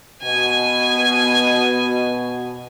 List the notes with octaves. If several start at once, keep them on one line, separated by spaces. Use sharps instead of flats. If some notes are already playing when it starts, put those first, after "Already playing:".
B2 G#5